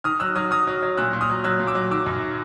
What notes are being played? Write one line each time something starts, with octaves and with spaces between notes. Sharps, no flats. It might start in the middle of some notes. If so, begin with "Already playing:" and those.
D#3 D#6 F6
F#3 E6 F#6
F#3 D#6 F6
F#3 D#6 F6
F#3
F#3
A#2 E6 F#6
A#2
D#6 F6
F#3
F#3 E6 F#6
A#2
D6 E6
F#3
D#3 D6 E6
F#2